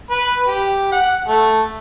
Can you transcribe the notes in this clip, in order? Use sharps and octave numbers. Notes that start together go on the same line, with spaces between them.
B4
G4
F#5
A3